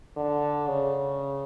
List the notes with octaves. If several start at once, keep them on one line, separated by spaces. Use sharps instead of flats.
D3
C#3